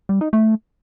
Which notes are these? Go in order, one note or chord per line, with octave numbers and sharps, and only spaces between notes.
G3
D#4
A3